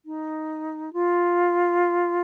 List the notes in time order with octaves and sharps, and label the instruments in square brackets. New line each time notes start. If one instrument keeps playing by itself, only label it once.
[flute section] D#4
F4